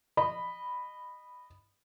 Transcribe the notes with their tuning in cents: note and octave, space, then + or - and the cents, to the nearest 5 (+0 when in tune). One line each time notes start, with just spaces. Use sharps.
D#5 -20 B5 +0